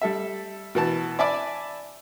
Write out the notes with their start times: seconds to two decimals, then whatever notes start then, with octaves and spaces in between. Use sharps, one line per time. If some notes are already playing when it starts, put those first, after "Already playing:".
0.02 G3 A4 E5
0.75 B2 E3 A5
1.19 D5 E5 G#5 A5 B5 D6